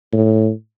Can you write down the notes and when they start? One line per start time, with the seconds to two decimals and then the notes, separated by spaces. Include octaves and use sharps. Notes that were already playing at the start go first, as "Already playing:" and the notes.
0.13 A2